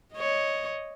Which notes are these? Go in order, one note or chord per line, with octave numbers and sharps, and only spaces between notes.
C#5 D#5